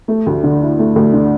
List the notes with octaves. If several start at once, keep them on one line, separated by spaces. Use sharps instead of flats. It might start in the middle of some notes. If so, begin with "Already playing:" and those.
A3
D2
D3
E4
A3
D2
D3